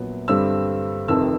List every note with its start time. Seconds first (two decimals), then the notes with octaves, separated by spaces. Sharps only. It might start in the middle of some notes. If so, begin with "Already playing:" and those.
Already playing: A#1 A#2 F#3 B3
0.28 G2 D3 G3 C4 E6
1.08 F1 F2 C3 D#3 E6